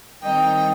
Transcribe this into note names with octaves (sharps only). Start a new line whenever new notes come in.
D#3 G3 C4 D#4 D#5 G5